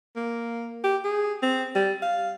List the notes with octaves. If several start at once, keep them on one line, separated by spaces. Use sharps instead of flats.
A#3
G4
G#4
C4
G3
F5